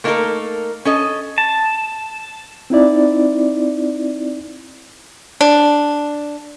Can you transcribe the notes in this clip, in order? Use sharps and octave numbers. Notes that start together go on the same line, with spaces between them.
A3 A#3 D#4 G4 A4 A#4
C#4 A4 D#5
A5
C4 D#4 E4 D5
D4